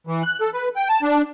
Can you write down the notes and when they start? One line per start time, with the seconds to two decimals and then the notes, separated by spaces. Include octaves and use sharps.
0.07 E3
0.23 F#6
0.41 A4
0.54 B4
0.76 G5
0.89 A5
1.02 D4